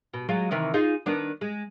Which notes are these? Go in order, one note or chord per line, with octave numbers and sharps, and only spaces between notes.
B2
F#3 G#3 F4
C3 D#3 E3
D#4 F4 G#4
D#3 B3 D4
G#3